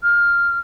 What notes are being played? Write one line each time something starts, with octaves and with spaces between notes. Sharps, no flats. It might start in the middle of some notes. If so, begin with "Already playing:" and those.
F6